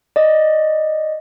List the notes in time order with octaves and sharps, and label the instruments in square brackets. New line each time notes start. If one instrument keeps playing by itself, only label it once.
[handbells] D5 D#5